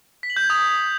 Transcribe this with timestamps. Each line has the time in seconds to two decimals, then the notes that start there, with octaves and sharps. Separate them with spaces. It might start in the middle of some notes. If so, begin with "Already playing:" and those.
0.23 B6
0.30 F#7
0.36 G6
0.43 G#6
0.50 D#6